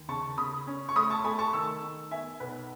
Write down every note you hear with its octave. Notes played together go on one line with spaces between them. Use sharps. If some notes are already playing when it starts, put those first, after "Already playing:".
Already playing: D#2
C#3 A5 C#6
C#3 B5 D#6
C#4
C#6
A3 B5 D#6
A5 C#6
A3 G#5 B5
A5 C#6
D#3 C#6 E6
D#3
B3 E5 G#5
B1 B4